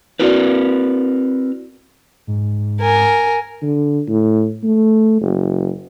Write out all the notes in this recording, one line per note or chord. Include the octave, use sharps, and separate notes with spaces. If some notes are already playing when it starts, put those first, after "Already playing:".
C4 E4 F#4 A#4 B4 D5
G#2
A#4 G#5
D3
A2
A3
F#1